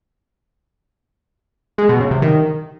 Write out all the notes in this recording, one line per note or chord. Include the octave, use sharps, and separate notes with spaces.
G#3
B2
C#3
C3
D#3